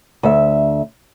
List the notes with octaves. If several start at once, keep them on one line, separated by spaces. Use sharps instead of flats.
D2 E5